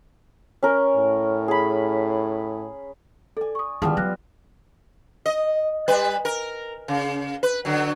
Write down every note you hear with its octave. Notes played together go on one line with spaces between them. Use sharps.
C#4 A#4
A2
G#4 B5
A4 D5 G#5
C#6 D#6
D#3 G3 B3 E4 F4 G#4 A5 D#6
F#3 F6 F#6 A#6
D#5
G3 B4
A#4
C#3
B4
D3 F#3